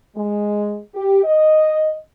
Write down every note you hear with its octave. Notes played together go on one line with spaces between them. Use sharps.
G#3
G4
D#5